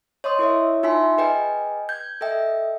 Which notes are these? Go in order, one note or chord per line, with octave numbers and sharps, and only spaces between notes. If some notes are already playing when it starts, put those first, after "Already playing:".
C#5 D#5 C6 D#6
E4 A#4 C#5 E5
D#4 F4 E5 G#5 C6 B6
G#4 B4 D#5 G5 G#5
G6 G#6
A4 D#5 E5 G5